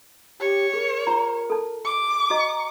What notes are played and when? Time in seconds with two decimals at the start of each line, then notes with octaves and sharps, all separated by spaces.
0.40 G4 C#5
0.74 G#4 A#4
1.07 F4 A#5
1.50 A4 A5
1.85 D6
2.30 F#4 D#5 A#5